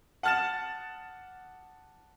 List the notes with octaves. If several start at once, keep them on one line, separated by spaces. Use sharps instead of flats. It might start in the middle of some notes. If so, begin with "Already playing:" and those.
F#5 A5 F6 A6 E7